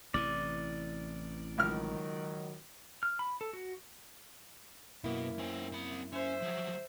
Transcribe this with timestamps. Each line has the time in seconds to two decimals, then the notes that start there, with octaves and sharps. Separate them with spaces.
0.14 A1 C3 E3 D5
1.58 C#2 D#3 F#3 F6
3.03 F6
3.19 B5
3.41 A4
3.53 F#4
5.04 F#2 B2 A#3 E4
5.39 C#4 C5
5.72 C4 B5
6.12 C#4 C5 E5
6.42 F3 F#3